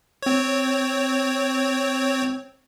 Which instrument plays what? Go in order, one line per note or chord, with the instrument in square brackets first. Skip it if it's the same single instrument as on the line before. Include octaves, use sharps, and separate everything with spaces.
[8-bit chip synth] C4 C#5